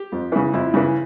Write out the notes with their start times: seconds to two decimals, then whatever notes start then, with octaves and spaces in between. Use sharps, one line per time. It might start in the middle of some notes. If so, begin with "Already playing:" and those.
Already playing: G4
0.12 F2
0.32 C#3 E3
0.53 F2 E4
0.74 C#3 E3